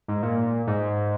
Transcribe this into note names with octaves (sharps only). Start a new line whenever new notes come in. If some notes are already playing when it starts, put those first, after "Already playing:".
G#2
A#2
G#2